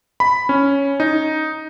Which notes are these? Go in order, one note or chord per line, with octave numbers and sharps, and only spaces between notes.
B5
C#4
D#4